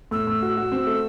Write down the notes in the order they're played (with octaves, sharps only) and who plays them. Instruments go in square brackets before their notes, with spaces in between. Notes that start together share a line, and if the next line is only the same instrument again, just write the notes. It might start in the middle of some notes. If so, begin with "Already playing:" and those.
[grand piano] A2 [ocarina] E6
[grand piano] A2
F#4
F#4
C4
A3